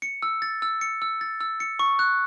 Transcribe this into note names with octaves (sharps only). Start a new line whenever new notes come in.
C#7
E6
A6
E6
C#7
E6
A6
E6
C#7
C#6
F#6